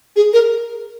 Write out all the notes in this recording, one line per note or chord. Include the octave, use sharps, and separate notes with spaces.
G#4
A#4